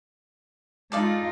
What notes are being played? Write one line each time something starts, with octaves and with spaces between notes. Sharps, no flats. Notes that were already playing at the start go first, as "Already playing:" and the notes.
G#3 D#4 F4 A4 D5 F5